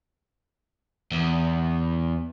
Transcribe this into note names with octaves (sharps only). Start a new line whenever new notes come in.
E2